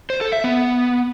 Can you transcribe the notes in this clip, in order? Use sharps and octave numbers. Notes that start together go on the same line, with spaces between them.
C5
A4
E5
B3